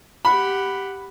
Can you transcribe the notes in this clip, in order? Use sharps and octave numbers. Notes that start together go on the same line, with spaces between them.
G4 F#5 B5